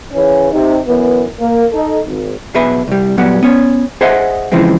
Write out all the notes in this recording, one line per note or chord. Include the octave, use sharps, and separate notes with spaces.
C#3 E3 C#4
C3 D#4
F#2 E3 B3
A#3
D#4 A4
G#1
B1 B2 G#4 B4 E5 B5
C2 G3
A#2 F#3 G3 B3 F#5
B3 C#4 C#5
G#4 C5 D#5 E5 F#5
C#3 E3 F3 G#3 C4